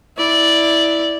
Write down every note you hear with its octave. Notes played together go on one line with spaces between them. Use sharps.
E4 D5